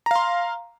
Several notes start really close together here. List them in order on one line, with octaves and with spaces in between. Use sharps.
A#5 F5 C6